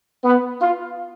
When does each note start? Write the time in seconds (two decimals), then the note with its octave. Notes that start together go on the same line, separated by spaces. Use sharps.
0.24 B3
0.61 F4